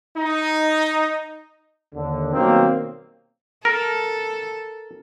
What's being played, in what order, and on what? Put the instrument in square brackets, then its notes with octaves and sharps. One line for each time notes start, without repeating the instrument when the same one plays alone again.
[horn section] D#4
[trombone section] D#2 D3
B2 D#3 F#3 G3 A#3 C4
[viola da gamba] A4 [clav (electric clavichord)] A#4